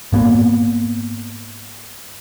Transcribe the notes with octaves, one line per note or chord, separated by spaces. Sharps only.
G#2 A#3 B3